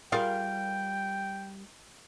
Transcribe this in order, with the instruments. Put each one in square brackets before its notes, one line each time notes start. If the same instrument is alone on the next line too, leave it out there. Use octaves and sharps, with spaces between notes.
[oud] G3 A#4 [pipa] F4 G#4 F5 [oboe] G5